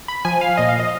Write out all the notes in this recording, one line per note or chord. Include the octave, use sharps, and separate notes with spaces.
B5
F3 G#5
F5
A#2 D#5
F5
D#5